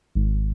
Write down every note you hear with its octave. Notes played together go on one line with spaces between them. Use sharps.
G#1